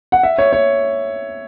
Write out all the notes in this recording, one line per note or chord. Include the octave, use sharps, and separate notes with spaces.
F#5
E5
C#5
C#5